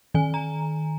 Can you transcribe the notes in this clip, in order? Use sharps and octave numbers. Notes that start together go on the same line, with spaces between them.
D#3 G#5
A#5